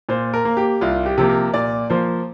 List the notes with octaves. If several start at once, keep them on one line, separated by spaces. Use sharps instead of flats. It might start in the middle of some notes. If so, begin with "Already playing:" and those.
A#2 C5
A#4
A#3
G4
C2 F4
G4
C3 F3 A#3
A#4
A#2 D5
F3 A#3 C5